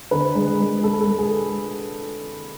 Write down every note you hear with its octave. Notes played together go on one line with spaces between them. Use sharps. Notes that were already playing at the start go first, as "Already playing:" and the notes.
D3 B4
G#3
G#3
G#3 A4
A4
G#3
G#4